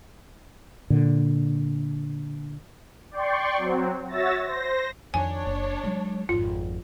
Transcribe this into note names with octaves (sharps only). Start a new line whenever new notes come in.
A#2 D3
D5 G5 C6 C#6
F#3 C4
F#4 C#5 E5 E6 A6 A#6
C5 A#6
F2 D#3 D4 C#5 G#5
F#1
F#3 G#3
G#1 F2 F4